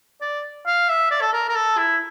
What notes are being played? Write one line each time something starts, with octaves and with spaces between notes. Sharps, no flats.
D5
F5
E5
D5
A4
A#4
A#4
A4
E4